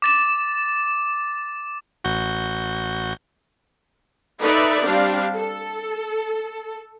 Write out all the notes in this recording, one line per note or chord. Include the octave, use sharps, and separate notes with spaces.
D6 A6 E7
A1 F#4 G6
D#4 A4 B4 D5 E5
G3 C4 D4 F5
A4